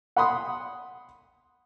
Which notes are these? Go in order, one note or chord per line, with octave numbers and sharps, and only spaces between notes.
F#5 B5 C6 D#6